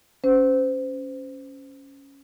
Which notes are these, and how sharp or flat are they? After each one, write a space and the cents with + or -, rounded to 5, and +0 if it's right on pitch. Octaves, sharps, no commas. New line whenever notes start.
C#4 +0 C5 -25